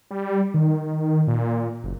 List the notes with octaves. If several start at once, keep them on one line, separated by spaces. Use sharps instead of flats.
G3
D#3
A#2
F#1